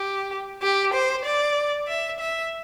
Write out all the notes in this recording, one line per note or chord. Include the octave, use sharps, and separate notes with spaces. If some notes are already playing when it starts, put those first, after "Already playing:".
Already playing: G4
G4
C5
D5
E5
E5